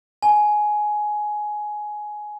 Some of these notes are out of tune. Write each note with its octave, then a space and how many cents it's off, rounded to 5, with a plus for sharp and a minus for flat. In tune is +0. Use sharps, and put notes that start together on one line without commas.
G#5 +15